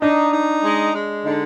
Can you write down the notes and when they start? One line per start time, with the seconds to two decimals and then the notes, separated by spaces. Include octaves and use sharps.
0.02 D4 D#4
0.33 D#4
0.64 G#3
0.94 G#3
1.25 D3 D#4